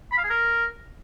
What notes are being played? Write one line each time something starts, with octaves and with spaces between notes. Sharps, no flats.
B5
F5
G#4
A#4